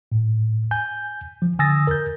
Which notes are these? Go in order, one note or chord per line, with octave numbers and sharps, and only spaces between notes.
A2
G#5 G6
F3
D3 G#5 D#6 E6 A6 A#6
A#4 G6